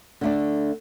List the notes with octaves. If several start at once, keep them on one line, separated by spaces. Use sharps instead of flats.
D3 A3 D4